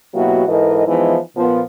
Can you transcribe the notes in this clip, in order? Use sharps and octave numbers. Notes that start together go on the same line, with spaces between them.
B2 F#3 A#3 E4 F#4 G4
G#2 E3 A4 A#4 D#5
E3 F3 G#3 B3 D#4 E4
A#2 F3 B3